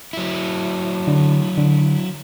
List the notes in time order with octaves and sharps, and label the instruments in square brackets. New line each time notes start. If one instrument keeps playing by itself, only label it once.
[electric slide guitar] F#3 E4
[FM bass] D3
D3